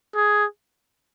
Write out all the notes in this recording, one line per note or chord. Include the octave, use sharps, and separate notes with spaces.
G#4